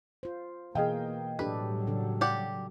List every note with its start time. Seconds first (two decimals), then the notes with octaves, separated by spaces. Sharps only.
0.23 F4 C5
0.75 B2 E3 A#3 G#4 D#5 F5 G5
1.39 A2 F#3 G3 D4 G4 A4 B4
1.87 C#3 D4 A4
2.21 G4 D5 F#5